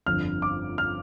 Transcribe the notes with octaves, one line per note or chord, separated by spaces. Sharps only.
G1 F2 D3 F6
D6
F6